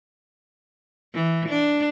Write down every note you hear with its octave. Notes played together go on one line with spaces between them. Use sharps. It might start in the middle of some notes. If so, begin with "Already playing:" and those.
E3
D4